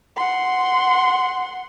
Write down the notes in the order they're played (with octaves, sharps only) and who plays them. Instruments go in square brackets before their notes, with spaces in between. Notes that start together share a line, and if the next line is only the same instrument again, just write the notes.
[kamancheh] F#5 C6